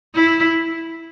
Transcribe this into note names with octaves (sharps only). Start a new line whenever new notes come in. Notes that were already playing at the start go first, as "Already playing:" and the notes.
E4